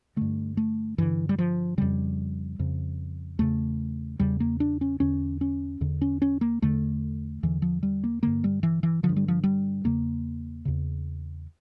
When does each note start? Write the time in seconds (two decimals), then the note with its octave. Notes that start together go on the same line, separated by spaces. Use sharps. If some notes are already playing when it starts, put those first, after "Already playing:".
0.16 G2 D3 A3
0.57 A3
0.98 G2 D3 E3
1.29 G3
1.38 F3
1.78 F2 C#3 G3
2.59 F2 C#3
3.39 E2 C#3 A3
4.19 E2 C#3 G3
4.40 A#3
4.60 D4
4.81 C#4
5.00 E2 D3 C#4
5.41 C#4
5.81 E2 D3
6.01 C#4
6.22 C#4
6.41 A#3
6.62 E2 D3 A3
7.43 E2 D3 E3
7.62 F3
7.83 G3
8.04 A#3
8.23 G2 D3 A#3
8.44 G3
8.63 E3
8.83 E3
9.03 D3 F3
9.09 G2
9.16 G3
9.28 F3
9.43 G3
9.84 E2 C#3 A#3
10.65 E2 C#3